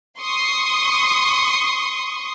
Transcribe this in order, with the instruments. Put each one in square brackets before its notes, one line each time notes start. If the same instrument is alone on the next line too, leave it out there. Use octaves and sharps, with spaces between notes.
[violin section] C6 C#6 D#6